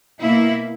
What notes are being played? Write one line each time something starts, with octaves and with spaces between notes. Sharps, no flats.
B2 A#3 E4